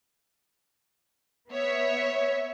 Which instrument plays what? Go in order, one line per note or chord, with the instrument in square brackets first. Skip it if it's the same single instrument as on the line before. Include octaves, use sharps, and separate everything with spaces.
[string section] B3 C#5 E5